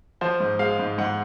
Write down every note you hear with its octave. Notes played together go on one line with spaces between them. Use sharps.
F3 C5
G#2
G#3 F5
G#2
G#2 F#5